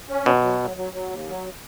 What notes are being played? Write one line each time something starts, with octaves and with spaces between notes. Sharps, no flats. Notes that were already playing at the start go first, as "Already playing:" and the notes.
C#4
B2 F#3
F#3
F#3
F#3
F#3
D#2
F#3